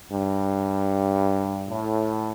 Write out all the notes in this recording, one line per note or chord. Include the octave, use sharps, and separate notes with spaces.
G2
A2